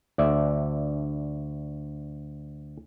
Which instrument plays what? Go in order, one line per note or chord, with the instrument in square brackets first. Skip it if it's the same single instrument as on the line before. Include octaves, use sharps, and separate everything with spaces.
[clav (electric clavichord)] D2 D5 E5